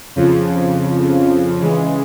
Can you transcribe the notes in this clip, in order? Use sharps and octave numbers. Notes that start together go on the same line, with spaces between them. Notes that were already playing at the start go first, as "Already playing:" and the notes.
F2 C#3 F3
C#3 E3 G#3